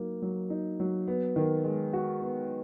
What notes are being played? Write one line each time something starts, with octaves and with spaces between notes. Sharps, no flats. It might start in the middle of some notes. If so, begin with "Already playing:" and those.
Already playing: F#3 A#3 D#4
F#3
D#4
F#3
B3
D#3
G#3
F#4
B3